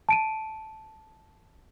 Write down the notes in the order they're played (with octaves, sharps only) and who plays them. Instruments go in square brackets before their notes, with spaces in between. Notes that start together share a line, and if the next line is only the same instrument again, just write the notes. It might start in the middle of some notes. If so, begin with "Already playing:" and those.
[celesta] A5 D7 D#7